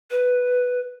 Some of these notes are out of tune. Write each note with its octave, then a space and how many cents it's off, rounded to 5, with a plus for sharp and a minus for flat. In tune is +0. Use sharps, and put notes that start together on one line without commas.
B4 +0